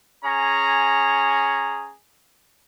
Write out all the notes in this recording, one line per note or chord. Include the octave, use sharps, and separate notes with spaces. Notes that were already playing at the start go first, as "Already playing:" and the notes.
C#4 G#4 A#5